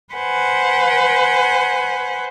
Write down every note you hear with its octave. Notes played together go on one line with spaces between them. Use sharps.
B4 C5 F#5 G#5